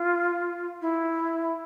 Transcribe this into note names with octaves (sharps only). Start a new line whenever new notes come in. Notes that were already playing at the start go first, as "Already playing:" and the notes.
Already playing: F4
E4